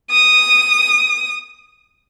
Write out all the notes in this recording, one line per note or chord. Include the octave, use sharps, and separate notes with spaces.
D#6